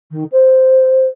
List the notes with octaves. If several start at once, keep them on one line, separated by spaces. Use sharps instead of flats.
D#3
C5